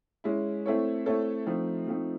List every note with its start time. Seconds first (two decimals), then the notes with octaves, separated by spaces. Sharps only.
0.24 G#3 C#4 E4
0.66 A3 C4 E4 A4 C#5
1.06 A3 C4 E4 A4 C#5
1.46 F3 A3 C4 D#4
1.87 F3 A3 C4 D#4